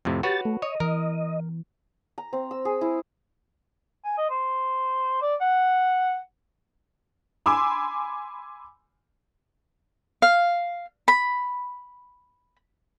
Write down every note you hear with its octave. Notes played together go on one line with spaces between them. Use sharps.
F2 A2 C3
F#4 G4 B4 C#5 A6
A3
C#5 D#5
E3 A#4
A#5
C4
E6
G#4
E4
G#5
D#5
C5
D5
F#5
G#5 B5 C6 D6 E6
F5
B5